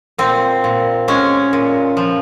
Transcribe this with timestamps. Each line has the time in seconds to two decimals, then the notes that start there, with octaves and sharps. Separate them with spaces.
0.18 A#2 C4
0.64 A#2
1.08 G#3 C#4
1.53 A#2
1.97 F3